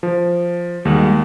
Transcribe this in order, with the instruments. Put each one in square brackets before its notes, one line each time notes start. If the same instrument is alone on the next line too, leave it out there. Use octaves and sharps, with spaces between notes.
[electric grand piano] F3
[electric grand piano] D#2 [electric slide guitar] G3 G#3 F#4